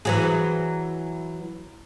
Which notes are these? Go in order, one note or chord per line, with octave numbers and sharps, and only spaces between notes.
E3 F#3 G#4